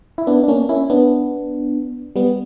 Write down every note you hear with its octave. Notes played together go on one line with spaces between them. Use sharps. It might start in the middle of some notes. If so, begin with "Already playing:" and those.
E4
B3 D4
D4
A#3 C#4
C#4 E4
B3 D4
G3 B3